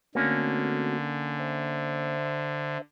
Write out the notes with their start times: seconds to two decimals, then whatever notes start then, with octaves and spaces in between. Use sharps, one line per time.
0.15 D3 A3 A#3 C4 C#4 F#4
1.39 C5 E5